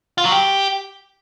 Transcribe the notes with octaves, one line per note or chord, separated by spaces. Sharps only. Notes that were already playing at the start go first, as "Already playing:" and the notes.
F4
F#3
G4